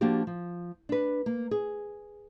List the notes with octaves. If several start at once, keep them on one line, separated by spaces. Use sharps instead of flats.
F3 A#3 D4 F#4 G4
F3
D4 B4
A#3
G#4